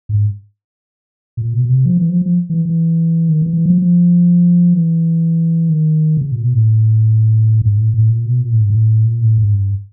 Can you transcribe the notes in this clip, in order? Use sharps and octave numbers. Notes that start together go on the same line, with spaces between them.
G#2
A#2
B2
B2
C3
F3
E3
F3
F3
E3
E3
D#3
E3
E3
F3
F3
E3
D#3
C#3
A#2
B2
A2
G#2
A2
A2
A#2
B2
A#2
A2
G#2
A2
A#2
A2
G#2
G2